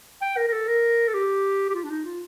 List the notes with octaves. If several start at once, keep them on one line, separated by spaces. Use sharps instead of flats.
G5
A#4
A#4
A4
A#4
A4
G4
G4
F4
D4
D#4
F4